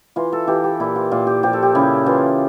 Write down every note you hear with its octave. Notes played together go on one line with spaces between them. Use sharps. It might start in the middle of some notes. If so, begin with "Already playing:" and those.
E3 F4
A4
E3 G4
G4
A#2 E4
F4
A#2 F4
G4
F3 G4
A4
G4
C#3 E4
E3 F4